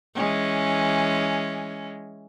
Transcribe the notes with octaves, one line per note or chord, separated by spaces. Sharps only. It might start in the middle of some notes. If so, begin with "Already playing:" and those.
E3 G#3 C#4